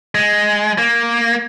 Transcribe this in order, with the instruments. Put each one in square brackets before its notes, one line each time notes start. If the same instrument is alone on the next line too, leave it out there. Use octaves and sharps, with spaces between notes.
[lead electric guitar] G#3
A#3